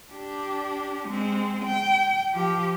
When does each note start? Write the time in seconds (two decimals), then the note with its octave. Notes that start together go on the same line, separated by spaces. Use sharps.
0.11 D4 G4
1.07 G#3 C4
1.65 G5
2.33 F3 G4